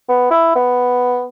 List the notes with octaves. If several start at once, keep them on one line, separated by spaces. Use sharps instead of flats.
B3
E4
B3